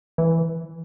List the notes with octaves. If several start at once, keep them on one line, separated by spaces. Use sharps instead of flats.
E3